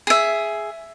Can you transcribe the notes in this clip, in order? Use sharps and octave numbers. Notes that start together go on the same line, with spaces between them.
G#4 E5